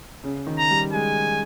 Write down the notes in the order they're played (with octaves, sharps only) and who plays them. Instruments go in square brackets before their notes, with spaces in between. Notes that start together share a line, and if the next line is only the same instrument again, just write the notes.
[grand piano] C#3
D#3
[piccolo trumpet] A#5
[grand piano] G3
[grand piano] G#3 [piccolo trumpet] G#5